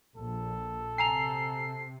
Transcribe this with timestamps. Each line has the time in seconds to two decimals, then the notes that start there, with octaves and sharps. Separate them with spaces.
0.17 A#1 A4
0.98 C3 G#5 A#5 C7 F7